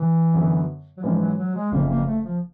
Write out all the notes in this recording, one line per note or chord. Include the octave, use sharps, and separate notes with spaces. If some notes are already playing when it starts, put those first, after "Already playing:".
Already playing: E3
F#2 D3 F#3 B3
F#3
G#2 E3 F3 G#3 C#4
F#3
F#3
G#3
F#1 F2 C#3 A#3
A#3
A3
F3